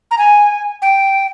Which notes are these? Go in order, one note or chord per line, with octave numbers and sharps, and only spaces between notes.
A#5
G#5
G5